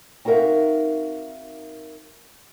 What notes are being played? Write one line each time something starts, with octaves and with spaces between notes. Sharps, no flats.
C4 D#4 F#4 A#4 E5 F5